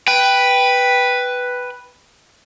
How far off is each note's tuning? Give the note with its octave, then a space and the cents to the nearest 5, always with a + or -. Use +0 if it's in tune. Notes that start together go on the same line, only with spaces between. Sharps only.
B4 +0 G5 +0